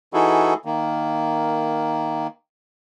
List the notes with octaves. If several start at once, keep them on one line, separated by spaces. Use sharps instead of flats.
E3 D#4 E4 F#4 G#4 A4
D#3 A#3